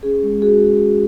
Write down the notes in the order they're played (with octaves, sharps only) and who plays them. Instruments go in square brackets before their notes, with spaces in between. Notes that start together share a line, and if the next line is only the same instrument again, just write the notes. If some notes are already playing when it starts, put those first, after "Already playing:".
[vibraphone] C#4 G#4
G#3
F#4 G#4